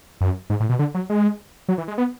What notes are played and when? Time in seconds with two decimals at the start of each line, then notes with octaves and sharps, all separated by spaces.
0.21 F#2
0.50 G#2
0.60 A2
0.69 B2
0.79 D3
0.94 F#3
1.10 G#3
1.68 F#3
1.78 E3
1.88 G#3
1.98 B3